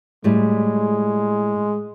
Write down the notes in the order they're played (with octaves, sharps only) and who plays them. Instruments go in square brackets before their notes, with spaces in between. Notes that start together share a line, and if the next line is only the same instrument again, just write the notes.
[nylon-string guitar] A2 G3 [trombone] G#3